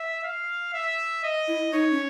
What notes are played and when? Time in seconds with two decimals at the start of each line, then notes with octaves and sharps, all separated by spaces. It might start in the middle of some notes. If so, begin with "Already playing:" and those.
Already playing: E5
0.24 F5
0.73 E5
1.23 D#5
1.48 E4
1.73 D#4 C#5
1.91 C#4